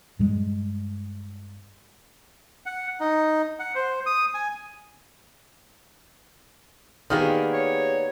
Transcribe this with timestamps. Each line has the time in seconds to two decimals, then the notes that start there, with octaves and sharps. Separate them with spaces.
0.19 G2 G3 G#3
2.66 F#5
3.00 D#4
3.59 F#5
3.75 C5
4.06 D#6
4.34 G#5
7.10 D#3 A#3 B3 G4 G#4 D5
7.53 C#5